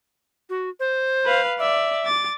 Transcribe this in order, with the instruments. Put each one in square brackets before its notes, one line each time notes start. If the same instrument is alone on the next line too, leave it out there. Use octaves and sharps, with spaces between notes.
[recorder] F#4
C5
[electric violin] B4 F5
[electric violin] D5 [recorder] E5
[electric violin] D6 A6